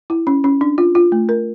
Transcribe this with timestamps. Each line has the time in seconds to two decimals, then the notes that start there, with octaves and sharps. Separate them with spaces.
0.10 E4
0.27 C#4
0.44 C#4
0.61 D4
0.78 F4
0.95 F4
1.12 A3
1.29 A#4